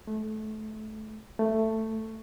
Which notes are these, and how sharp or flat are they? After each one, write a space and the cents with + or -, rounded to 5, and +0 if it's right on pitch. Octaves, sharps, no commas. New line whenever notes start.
A3 -25
A3 +10